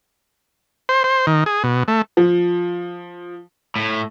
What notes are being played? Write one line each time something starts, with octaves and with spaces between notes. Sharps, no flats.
C5
C5
D#3
G#4
B2
A3
F3
A2